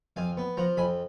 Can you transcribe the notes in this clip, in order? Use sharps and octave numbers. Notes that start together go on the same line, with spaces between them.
F2 F5 G#5
B3
F3 F#5 A#5
F2 G#5 B5